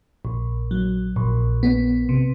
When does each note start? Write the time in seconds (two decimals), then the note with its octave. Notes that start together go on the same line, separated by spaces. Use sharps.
0.25 A#1
0.71 F#3
1.16 A#1
1.63 B3
2.09 C3